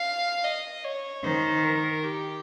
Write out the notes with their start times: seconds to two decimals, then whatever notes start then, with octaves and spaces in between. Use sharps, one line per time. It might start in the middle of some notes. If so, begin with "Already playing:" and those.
Already playing: F5
0.44 D#5
0.85 C#5
1.24 D#3 C5
1.64 A#4
2.04 G4